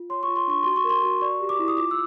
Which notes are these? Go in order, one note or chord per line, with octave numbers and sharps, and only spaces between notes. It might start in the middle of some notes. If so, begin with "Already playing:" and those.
Already playing: F4
C#5 C6
F4 C#6
C6
D4 C#6
F#4 C6
C#6
A#4
C6
F#4
D5 C#6
G4
D6
E4
D#6
F4 D6
E6